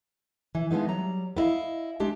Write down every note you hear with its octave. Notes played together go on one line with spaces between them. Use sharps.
E3
E3 F3 G#3 B3 D#4
F#3 G3 A#5
B3 E4 D#5 F5
G#3 D4 G4